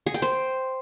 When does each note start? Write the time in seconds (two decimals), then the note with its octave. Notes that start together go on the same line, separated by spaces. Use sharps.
0.06 G#4
0.14 G5
0.22 C5